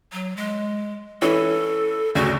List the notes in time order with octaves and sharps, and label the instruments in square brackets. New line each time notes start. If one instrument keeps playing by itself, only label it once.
[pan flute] F#3
G#3
[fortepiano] E3 C#4 [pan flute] A4
[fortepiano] D2 C#3 [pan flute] F#4